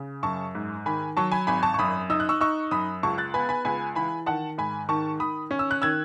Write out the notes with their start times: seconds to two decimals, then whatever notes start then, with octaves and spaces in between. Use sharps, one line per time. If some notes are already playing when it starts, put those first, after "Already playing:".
Already playing: C#3
0.23 F#2 A5 C#6
0.55 G#2
0.86 D#3 G#5 B5
1.17 F#3 A5 C#6
1.32 G#5 B5
1.47 G#1 G#5 B5
1.63 A5 C#6
1.74 C#6
1.79 F#2 B5 D#6
2.10 D#4 E6
2.20 F#6
2.29 C#6 E6
2.41 D#4 C#6 E6
2.71 F#2 B5 D#6
3.03 C#2 A5 C#6
3.18 F#6 A6
3.34 B3 G#5 B5
3.49 G#5 B5
3.65 C#2 G#5 B5
3.95 E3 G#5 B5
4.26 D#3 F#5 A5
4.58 G#2 G#5 B5
4.89 D#3 A5 C#6
5.20 D#3 B5 D#6
5.51 C#4
5.59 E6
5.71 F#6
5.82 D#3 E6 G#6